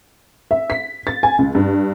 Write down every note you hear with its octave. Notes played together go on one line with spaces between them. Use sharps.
E5
B6
A6
G#5
C#2
G2